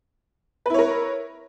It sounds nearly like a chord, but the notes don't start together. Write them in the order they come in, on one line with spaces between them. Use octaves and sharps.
B4 E4 C#5 A#4